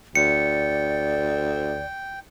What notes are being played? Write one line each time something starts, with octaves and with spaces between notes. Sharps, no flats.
D2 D5 G5 C#7